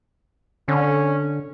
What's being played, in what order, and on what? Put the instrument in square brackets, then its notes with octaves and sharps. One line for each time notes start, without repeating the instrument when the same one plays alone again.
[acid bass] D3 [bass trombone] C#4